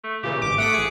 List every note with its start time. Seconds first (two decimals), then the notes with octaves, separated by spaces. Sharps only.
0.04 A3
0.23 A#2 C#3 E3 G4
0.42 G#1 D6
0.58 A3 F#5 D#6 B6
0.74 A1 G#4 C#7